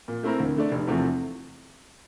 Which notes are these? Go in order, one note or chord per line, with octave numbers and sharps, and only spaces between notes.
A#2
A3 C4 E4 A#4
D2
D3 A3 D4
F1
E2 C3 F3 A3